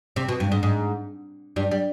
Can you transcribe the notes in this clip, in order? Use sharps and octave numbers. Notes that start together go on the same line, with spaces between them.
C3
B2
G2
G#2
G#2
G2 G3
G3